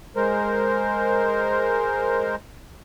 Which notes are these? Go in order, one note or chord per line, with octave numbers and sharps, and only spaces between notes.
G#3 A#4 C5